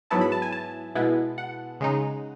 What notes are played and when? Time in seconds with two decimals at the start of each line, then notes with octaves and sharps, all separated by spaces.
0.10 G#2 F#3 B3 E4 A5
0.21 B5
0.32 A5
0.42 G#5
0.52 A5
0.95 B2 G#3 B3 E4
1.38 F#5
1.80 C#3 G#3 D#4